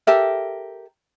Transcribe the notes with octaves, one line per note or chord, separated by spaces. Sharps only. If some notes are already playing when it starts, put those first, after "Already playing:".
G4 A4 A#4 E5